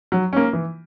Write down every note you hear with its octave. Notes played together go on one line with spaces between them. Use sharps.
F#3
A#3 C#4
E3